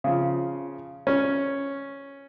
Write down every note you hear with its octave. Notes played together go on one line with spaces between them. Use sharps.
C#3 F3
C#4